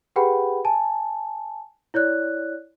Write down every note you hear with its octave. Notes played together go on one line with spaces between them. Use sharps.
G4 G#4 B4 F#5 G5 B5
G#5 A5
E4 C#5 D5 F#6